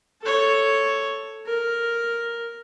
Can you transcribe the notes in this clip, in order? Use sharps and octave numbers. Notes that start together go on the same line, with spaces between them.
A4 C#5
A#4